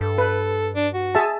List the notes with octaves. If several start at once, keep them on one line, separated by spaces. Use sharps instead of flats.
G2 A4
B4
D4
F#4
G#4 E5 A5